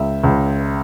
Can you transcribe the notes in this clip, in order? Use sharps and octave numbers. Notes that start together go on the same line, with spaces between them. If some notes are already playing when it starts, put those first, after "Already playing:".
Already playing: C#2 E5
C#2